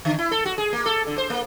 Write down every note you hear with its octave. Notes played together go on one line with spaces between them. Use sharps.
D3
E4
A4
F#4
G#4
A#3
A4
D3
C5
A#3